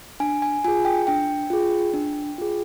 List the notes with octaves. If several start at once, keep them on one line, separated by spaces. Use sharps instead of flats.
D4 G#5
G#5
F4 G#4 G#5
G5
D4 G5
F4 G#4
D4
F4 G#4